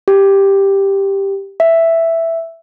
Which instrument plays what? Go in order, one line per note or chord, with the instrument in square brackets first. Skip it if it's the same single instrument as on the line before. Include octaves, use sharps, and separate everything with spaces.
[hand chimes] G4
E5